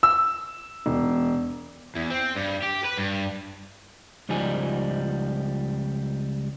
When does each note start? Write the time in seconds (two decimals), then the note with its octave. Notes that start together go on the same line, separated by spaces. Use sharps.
0.03 E6
0.86 E1
1.96 E2
2.11 C4
2.36 G2
2.63 G4
2.85 B4
2.99 G2
4.29 C#2 F3 G3 D#4 G#5